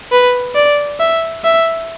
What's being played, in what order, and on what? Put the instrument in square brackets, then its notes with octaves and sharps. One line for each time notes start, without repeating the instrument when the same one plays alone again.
[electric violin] B4
D5
E5
E5